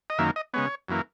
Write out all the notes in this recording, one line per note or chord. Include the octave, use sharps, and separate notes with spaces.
D#5
F#2 D#3 A#3 E5
D#5
C#3 G#3 B3 C#5
F#2 E3 A#3